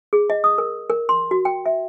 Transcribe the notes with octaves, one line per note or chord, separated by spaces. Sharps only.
G#4
D#5
D#6
A#4
A#4
C6
F#4
G5
E5